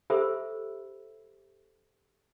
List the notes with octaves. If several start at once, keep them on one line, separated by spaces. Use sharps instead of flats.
G4 A4 C5 E5 B5 E6